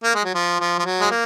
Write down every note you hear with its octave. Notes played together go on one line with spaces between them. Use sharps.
A#3
G#3
F#3
F3
F3
F3
F#3
G#3
A#3